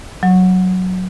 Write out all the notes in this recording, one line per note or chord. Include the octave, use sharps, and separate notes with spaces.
F#3